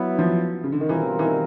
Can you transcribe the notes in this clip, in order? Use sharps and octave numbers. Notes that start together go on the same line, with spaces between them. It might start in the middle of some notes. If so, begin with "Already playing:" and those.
Already playing: F#3 B3 E4
F3
C#3
D3
D#3
B2 E3 G3 C4 F4 A#4
E3
D#3